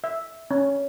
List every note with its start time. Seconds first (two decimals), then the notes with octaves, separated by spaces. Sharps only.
0.04 E5
0.51 C#4